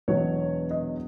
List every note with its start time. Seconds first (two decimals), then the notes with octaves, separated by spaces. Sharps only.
0.08 E1 E2 B2 F#3 B3 C#5
0.71 D#5